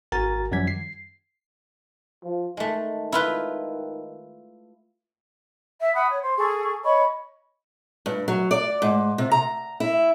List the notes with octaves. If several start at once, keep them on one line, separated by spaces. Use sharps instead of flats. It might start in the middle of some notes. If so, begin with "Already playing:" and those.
G#1 F#4 A#4 G#5 A#5 A6
F#2 D#3 F3 G3 G#6 B6
C7
F3
D#3 G#3 A3
E4 F4 B4
E5
F#5 B5 D#6
C#5
C5
G#4 A4 C#6
C#5 D#5 B5 C#6
G2
F#3
D5
G#2
C3
A#5
E4